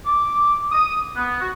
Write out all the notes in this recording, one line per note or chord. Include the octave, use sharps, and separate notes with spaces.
D6
D#6
B3
F#4